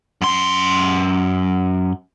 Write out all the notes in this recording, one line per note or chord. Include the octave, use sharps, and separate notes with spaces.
F#2 C6